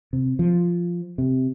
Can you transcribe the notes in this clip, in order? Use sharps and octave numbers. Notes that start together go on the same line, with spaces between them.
C3
F3
C3